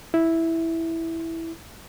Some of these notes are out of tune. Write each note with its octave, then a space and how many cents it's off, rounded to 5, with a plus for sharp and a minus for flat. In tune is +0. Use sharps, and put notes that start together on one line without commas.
E4 -5